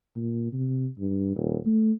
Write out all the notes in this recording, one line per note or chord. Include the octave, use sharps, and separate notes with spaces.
A#2
C3
G2
D#1
A3